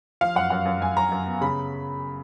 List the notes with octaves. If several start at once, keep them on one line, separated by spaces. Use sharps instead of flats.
F3 F5
F#2 F#5
F#2 F#5
F#2
F#2 G#5
F#2 A#5
F#2
B3
C#3 B5